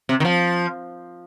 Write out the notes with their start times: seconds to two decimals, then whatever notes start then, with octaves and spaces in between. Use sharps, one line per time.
0.09 C3
0.20 D#3
0.25 F3